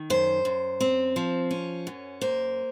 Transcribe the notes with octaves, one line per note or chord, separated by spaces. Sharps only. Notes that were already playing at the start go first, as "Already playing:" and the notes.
Already playing: D#3
F#2 C5
F#2
C4
F3
C#4
F#2
A#3 C5